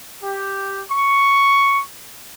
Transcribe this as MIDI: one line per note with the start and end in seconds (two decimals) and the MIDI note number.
0.23 0.83 67
0.92 1.83 85